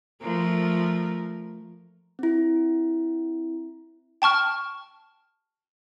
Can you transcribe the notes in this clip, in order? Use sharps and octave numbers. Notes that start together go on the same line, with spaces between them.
F3 A3 A#4
C4 E4
G5 A5 C#6 F6